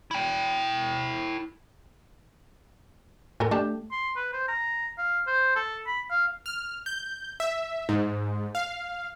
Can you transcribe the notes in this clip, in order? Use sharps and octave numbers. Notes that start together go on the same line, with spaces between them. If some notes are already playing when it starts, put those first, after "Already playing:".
E4 G5
A2 A4 A#4 G#5
A3 D4 G4 A5
C6
B4
C5
A#5
F5
C5
A4
B5
F5
F6
G6
E5
G#2
F5